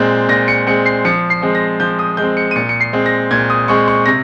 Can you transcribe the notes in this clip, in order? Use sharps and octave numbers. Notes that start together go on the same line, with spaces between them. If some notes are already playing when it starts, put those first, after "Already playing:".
Already playing: A#2 G#3 C4
A#2 A#6
C#7
G#3 C4 C#7
C7
F3 C#7
C7
G#3 C4
A#6
F3 G6
D#6
G#3 C4 G6
C#7
D#7
A#2 C#7
C#7
C7
G#3 C4
A#6
A#2 G#6
D#6
G#3 C4 C#6
C#6
C3 A#6